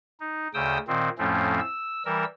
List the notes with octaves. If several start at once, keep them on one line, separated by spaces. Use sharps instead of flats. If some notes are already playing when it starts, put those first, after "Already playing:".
D#4
D2 C#3 G5 D#6 E6
A#2 D#3 C4
F2 A2 F3 A3 C4 C#4
E6
E3 G3 A#4 E6